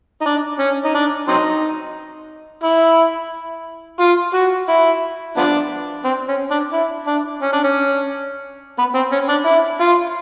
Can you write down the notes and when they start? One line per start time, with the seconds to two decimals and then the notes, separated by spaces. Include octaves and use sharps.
0.21 D#4
0.25 D4
0.59 C#4
0.84 D#4
0.94 D4
1.28 F#3 C4 D#4
2.63 E4
4.00 F4
4.34 F#4
4.68 E4
5.37 F3 B3 D4
6.04 C4
6.28 C#4
6.50 D4
6.72 E4
7.07 D4
7.41 C#4
7.53 D4
7.64 C#4
8.78 B3
8.94 C4
9.12 C#4
9.29 D4
9.46 E4
9.80 F4